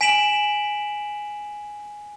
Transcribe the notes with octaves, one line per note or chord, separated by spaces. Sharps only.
G#5 B6 D7 E7 F#7